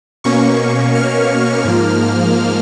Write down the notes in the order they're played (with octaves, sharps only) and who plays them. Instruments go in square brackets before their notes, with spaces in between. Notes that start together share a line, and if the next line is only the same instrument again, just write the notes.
[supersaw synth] B2 A#3 C#4 C#6
F6
G#2 F3 A#3